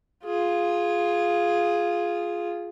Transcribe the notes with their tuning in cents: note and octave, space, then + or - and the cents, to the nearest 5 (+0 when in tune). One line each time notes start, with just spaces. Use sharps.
F4 +0 G#4 +0